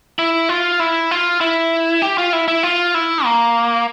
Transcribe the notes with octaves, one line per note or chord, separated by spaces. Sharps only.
E4
F4
E4
F4
E4
G4
F4
E4
E4
F4
E4
A#3